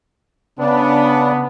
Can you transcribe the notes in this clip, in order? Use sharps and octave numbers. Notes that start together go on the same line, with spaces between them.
C#3 B3 D4